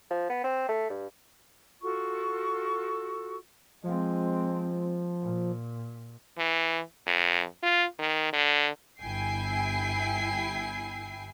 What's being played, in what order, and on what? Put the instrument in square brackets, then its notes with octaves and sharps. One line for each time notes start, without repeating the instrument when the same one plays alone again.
[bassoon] F3
B3
C4
A3
G2
[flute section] F4 F#4 A4 C#6
[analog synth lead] F3 [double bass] G#3 C4
[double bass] A#2
[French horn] E3
F2
F4
D#3
D3
[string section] G1 E4 G5 G#5 C7